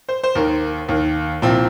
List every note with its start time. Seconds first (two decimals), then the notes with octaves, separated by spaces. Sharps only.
0.09 C5
0.24 C5
0.35 D#2 D#3 A#4
0.89 D#2 D#3
1.42 C2 A#2 F3 C4